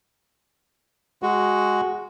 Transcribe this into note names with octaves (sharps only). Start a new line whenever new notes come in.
G#3 F#4